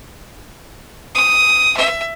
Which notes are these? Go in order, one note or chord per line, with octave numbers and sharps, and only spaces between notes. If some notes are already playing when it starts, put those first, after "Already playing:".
D#6
E5